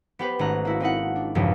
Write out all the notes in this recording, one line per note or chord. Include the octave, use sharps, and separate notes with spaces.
B3 G4 B4 C5
G#1 A3 C#4 A#5 F#6
A#3 E4 F#4
C4 D#4 E4 F#5
D4
A#1 E2 G2 C#3 F3